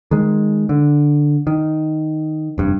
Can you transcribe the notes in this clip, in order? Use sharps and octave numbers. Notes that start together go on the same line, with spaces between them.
D#3 G#3
D3
D#3
F1 G2